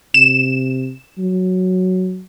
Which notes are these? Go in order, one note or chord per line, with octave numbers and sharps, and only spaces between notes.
C3 E7
F#3